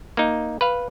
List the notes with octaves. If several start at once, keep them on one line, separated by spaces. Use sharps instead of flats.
A#3 D#4
B4 F5